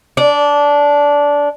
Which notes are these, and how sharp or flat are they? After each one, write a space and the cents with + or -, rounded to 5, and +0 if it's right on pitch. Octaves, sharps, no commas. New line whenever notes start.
D4 -15